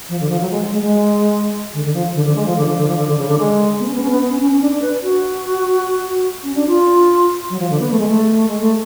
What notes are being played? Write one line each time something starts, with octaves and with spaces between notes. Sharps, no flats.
F3
D3
F3
F#3
G#3
G#3
G#3
D3
D3
F3
D3
D3
G#3
F3
D3
F3
D3
F3
D3
D3
C#3
D3
G#3
B3
C#4
B3
C#4
B3
C#4
C#4
C#4
D4
D4
B4
F#4
C#4
D4
F4
F#3
F3
D3
B3
A3
G#3
A3
G#3
A3